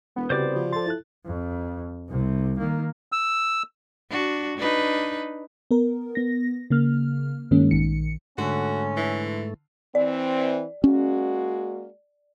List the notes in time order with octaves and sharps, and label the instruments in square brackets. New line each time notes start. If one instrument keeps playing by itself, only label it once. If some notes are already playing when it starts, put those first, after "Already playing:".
[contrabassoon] E1 [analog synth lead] B3
[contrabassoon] C2 [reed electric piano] C#3 F#4 G4 [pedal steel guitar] C5 D5 D6
[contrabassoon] F3
[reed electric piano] A4 C6 [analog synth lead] A6
[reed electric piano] E4 A4 F#6
[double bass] F2
C2 C3
D#3 A#3
[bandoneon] E6
[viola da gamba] D4 F#4
D4 D#4 B4
[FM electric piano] B3 A#4
B3 A#6
C#3 A#3 F6
G2 D#3 G#3 A#3 C#4
A#1 D#3 C#7
[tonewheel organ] G#2 A3 [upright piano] D3 [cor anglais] C#4 [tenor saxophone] F#4
[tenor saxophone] E3
[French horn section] E3 C4 [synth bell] D5
[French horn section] G#3 A#3 F#4 [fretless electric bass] C#4